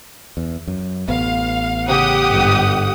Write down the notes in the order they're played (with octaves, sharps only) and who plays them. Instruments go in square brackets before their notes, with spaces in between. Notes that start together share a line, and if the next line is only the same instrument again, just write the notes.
[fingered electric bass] E2
F#2
[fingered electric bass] A1 B3 [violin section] F5
[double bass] C#3 [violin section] G4 F#5 D#6
[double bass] G1 G#2